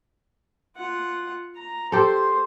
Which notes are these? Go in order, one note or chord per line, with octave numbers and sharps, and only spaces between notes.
F4 F#5
A#5
G4 A4 C5 C6